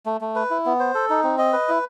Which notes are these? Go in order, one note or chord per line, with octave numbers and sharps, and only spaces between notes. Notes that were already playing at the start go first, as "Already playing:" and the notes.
A3
A3
B4
E4
B3
C5
A4
D#4
C4
D#5
B4
E4